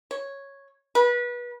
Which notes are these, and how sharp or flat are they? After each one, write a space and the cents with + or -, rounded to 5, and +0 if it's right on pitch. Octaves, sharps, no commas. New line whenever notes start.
C#5 -5
B4 -30